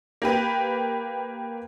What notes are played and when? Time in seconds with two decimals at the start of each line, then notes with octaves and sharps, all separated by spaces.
0.22 A#3 G4 B4